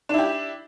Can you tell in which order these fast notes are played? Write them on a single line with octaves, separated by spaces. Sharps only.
D4 E4 G4